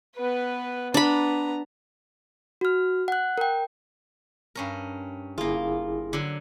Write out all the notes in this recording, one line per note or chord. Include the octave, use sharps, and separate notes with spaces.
B3 B4
B3 D4 A#5 B5
F#4 F6
F#5 F#6
A#4 G5
G2 C#4 A#4
G1 A#3 E4 F4 G#4
D3 F#3